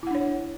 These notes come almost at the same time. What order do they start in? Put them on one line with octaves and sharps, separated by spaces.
E4 F#5 D4 C#5